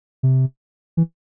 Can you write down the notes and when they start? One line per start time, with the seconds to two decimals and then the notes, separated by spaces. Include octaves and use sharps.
0.23 C3
0.97 E3